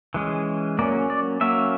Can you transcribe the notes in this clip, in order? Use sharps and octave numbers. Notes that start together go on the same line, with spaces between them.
E3 G#3 C#4
F#3 A#3 C#4 D5
D5
F#3 A#3 C#4 E5